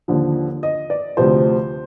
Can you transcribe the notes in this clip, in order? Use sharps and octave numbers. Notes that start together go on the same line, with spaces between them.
D#2 D3 F3
D#5
D5
D2 C3 F3 C5